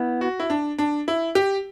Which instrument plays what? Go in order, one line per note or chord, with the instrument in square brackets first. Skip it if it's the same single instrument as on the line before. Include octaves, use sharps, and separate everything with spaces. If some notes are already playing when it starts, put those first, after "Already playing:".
Already playing: [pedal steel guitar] B3 E4
[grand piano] F#4
E4
D4
D4
E4
G4